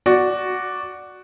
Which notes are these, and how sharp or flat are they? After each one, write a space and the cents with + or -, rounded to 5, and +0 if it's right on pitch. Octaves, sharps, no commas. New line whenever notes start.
F#4 +0 D5 +0